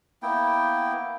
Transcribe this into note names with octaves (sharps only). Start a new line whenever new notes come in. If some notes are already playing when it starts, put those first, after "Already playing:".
A#3 B3 E4 G5